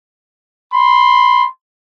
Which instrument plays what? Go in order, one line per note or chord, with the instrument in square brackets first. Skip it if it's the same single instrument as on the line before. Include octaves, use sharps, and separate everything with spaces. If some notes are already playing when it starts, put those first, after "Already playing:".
[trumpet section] B5 C6